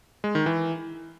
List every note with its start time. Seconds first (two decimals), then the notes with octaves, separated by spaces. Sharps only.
0.24 G#3
0.35 D#3
0.46 E3